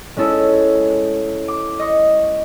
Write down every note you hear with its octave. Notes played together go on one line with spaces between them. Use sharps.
G#3 C#4 E4 A4 C#5
D6
D#5 C#6